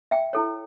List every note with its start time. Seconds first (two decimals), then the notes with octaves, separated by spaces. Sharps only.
0.11 E5 G5
0.33 E4 A4 C#5